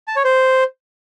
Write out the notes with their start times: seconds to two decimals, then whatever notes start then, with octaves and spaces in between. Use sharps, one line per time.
0.08 A5
0.16 C#5
0.25 C5